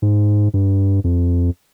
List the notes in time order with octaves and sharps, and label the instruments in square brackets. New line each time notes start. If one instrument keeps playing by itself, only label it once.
[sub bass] G#2
G2
F2